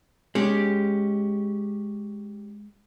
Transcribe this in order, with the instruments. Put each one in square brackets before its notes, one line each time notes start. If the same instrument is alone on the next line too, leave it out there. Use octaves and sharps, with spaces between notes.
[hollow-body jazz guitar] G#3 [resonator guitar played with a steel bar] C#4 G4